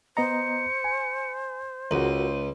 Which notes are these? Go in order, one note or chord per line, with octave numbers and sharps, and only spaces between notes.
B3 C5 D#5 A#5 C#7
G#5
C#2 F#4 A#4 D#7